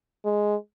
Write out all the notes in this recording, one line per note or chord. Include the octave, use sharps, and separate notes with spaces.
G#3